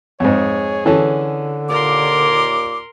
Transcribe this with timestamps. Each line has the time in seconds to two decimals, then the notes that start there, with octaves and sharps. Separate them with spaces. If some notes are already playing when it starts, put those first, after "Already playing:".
0.20 F2 G#2 G#4 C#5
0.86 D3 E3 C#4 A4
1.70 D#2 A#2 A#4 C6 D6